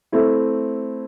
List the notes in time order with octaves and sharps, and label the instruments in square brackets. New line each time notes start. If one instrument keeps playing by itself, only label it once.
[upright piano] A3 C4 E4